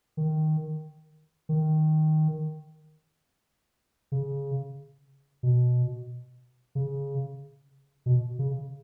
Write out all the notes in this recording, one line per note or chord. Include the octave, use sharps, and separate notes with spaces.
D#3
D#3
C#3
B2
C#3
B2
C#3